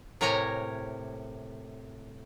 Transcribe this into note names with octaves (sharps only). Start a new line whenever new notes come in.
A2 C3 A#4 C#5 G#5 A#5